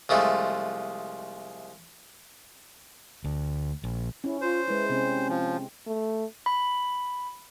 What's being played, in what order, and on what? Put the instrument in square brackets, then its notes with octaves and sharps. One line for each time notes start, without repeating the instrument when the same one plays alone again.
[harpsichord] C2 F3 G#3 A3
[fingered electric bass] D2
A#1
[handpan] C#4 [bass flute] E4
[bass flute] F4 [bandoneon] C5
[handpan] G#3 E4 [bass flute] B4
[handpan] C3 C4 [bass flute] C#4
[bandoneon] F3
[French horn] A3
[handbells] B5